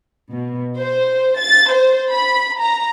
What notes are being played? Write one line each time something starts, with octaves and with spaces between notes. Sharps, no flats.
B2
C5
A6
C5
B5
A#5